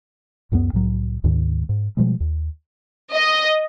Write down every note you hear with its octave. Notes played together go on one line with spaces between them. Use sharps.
C#2 F#2 A3 B3
C2 A2 F#3
D2 G#2 D#3
G#2
B2 F3 G3 G#3
D#2
D#5